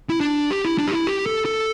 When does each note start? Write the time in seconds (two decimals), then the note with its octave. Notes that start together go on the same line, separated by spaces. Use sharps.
0.10 E4
0.21 D4
0.50 G4
0.65 E4
0.78 D4
0.88 G4
0.92 E4
1.07 G4
1.26 A4
1.45 A4